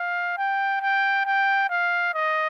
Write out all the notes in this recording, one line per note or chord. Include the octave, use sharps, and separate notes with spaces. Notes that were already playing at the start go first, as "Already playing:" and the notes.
Already playing: F5
G5
G5
G5
F5
D#5